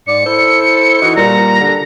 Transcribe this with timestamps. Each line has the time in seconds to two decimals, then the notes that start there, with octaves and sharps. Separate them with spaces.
0.07 G#2 D5 C#7
0.24 E4 A4 C5
1.02 E3 D#4 F#4
1.16 A#2 G3 A#5
1.59 D3 G3